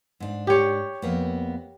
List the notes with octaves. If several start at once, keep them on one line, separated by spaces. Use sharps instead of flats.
G#2 D4
G4 C#5
F2 A#3 B3